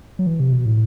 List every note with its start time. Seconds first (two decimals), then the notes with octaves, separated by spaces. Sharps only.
0.19 F#3
0.27 E3
0.40 C3
0.52 B2
0.66 A2